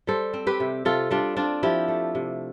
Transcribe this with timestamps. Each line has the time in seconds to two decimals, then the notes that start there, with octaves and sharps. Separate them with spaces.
0.07 G3 A4 C5
0.33 C4
0.47 G4 B4
0.60 C3
0.85 C3 F4 A4
1.11 G3 D4 F4
1.37 C4 D4 F4
1.63 F3 E4 G4
1.88 A3
2.15 C3